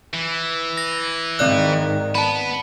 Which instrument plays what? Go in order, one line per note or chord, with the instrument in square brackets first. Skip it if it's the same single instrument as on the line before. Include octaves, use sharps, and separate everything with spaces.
[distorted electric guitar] E3
[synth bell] A#6
[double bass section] G#2 D#3 [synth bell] C4 D5 F#6
[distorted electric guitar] B3 [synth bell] A5 B5